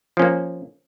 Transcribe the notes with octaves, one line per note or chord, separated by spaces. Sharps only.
F3 A#3 C#4